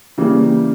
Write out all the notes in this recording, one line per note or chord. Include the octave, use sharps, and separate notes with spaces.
C#3 E3 G3 A#3